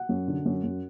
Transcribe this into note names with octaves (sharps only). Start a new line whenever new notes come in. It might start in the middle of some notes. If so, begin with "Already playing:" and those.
Already playing: F#5
F#2
D3
F#2
F#2